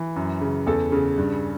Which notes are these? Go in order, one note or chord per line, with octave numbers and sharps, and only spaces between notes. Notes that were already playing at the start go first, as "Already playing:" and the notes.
Already playing: E3
F#2
C#3
E2 A4
C#3
G2